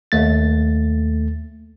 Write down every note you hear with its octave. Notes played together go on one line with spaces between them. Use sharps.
D#2 A3 A6